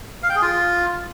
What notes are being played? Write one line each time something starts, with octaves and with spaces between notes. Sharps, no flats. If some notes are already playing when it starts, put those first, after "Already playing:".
F5
G5
G#4
F4